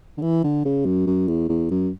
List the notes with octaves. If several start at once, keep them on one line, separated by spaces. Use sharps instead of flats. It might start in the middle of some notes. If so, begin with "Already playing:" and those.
D3
E3
D3
C#3
F#2
F#2
E2
E2
F#2